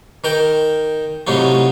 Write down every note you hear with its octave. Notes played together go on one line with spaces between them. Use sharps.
D#3 A#4 G5
A2 C3 F#3 D#4 F4